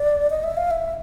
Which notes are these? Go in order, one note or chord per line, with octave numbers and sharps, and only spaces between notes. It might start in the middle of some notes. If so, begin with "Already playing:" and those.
Already playing: D5
D#5
E5
F5
E5